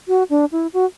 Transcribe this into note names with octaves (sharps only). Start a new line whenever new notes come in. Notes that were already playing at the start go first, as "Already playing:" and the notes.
F#4
D4
E4
F#4